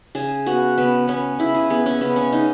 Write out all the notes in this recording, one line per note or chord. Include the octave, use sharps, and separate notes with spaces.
C#3 G#4
B3 F#4
C#3 B3
B3 C#4
C#3 E4
G#4
B3 G#4
C#4
C#3 B3
C#4
C#3 D#4